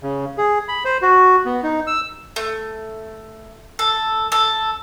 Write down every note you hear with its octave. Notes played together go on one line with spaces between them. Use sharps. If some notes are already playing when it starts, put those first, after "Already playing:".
C#3
G#4
B5
C5
F#4
B3
D#4
E6
A3
A4
A4